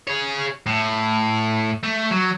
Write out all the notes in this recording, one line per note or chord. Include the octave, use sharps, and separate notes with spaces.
G#4 C#5
A2
A3
F#3